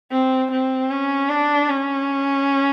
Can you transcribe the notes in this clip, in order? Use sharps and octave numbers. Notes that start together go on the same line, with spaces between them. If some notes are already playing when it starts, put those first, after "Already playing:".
C4
C4
C#4
D4
C#4